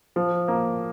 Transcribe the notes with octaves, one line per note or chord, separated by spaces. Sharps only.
F3
A#3